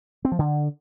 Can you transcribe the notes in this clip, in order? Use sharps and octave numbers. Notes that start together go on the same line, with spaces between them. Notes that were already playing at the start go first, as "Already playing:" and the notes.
C4
F3
D3